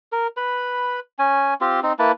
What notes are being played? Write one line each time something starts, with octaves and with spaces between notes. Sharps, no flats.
A#4
B4 B5
C#4 G#5
C4 F4 G4
C4 D#4
A#3 E4 B4 A5